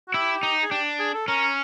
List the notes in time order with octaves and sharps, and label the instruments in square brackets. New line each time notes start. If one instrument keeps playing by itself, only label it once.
[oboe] F#4
[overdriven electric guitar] E4 [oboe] G4
[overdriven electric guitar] D#4
[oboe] G#4
[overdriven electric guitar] D4 [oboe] G4
[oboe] G#4
A4
[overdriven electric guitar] C#4 [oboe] A#4